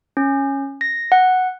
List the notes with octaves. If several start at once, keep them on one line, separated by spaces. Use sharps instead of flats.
C#4
A#6
F#5